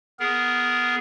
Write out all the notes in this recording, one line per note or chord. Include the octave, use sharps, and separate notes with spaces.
B3 G#4 A#4